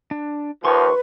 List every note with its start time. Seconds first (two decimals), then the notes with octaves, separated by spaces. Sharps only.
0.11 D4
0.65 D#2 F3 B4 C6 C#6